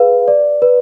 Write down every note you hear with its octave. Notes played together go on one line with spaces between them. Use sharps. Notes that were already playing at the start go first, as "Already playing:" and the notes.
Already playing: G#4 B4 F5
D5
B4